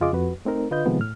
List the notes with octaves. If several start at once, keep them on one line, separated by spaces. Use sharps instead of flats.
F2 C#3 F4 G#4 D#5 D6
F2 F#4 B4
A3 C4 D#4 A#4
D3 F4 B4 D#5 G6
C3 D#3 F3 G#3 B3
A2 F6